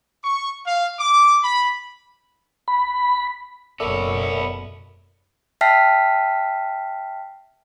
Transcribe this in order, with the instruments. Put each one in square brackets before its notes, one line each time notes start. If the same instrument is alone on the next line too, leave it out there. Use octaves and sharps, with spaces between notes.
[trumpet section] C#6
F5
D6
B5
[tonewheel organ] B5
[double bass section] F#1 B2 [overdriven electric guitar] B3 C#5 [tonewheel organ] A4 D5 E5 [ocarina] A#4
[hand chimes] E5 G5 A5 F6 B6 C7